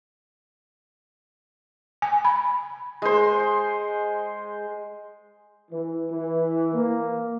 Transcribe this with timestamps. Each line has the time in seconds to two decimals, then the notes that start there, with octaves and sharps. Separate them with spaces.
2.02 G#5
2.25 B5
3.02 G#3 C5
5.71 E3
6.10 E3
6.72 A#3